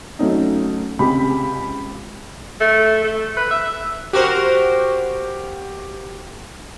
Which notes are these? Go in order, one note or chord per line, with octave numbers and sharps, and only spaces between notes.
F#3 A3 C#4 D#4
C#2 C3 G#3 G4 B5
A3
A3
B4
E5
F#4 G4 A#4 C5